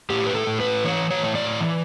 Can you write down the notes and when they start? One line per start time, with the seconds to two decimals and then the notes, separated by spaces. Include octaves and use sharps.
0.10 A2 G4
0.26 B4
0.35 A4
0.47 A2
0.60 B4
0.84 E3 C#5
1.10 C#5
1.23 A2
1.35 D5
1.60 E3